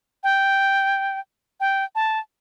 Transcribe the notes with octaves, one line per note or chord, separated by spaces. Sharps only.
G5
G5
A5